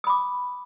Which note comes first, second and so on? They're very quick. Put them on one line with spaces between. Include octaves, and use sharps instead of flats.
D#6 B5 D6